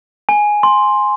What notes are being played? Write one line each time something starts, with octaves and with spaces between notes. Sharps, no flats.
G#5
C6